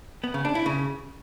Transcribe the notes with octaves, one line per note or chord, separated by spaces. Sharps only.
B3
C#3
D4
E4
C#3